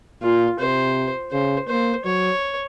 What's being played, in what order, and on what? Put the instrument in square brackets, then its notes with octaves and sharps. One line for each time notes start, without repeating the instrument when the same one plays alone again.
[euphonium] A#2 [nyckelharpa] F4
[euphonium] C3 [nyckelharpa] C5
[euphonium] C#3 [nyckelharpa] C5
[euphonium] A#3 [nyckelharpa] C5
[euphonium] F#3 [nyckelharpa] C#5